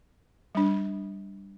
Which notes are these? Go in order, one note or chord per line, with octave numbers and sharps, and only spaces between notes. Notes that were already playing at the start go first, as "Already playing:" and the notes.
G3 D4